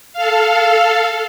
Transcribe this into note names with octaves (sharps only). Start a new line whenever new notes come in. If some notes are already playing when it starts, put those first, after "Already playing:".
A4 F5